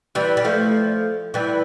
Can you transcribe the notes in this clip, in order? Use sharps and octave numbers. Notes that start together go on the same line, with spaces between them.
E3 G3
G3
F3 A3
E3 G3